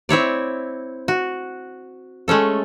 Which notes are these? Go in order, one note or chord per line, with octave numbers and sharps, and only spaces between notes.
C4 E4 C#5 D5
F#4
G#3 A3 C#4 A4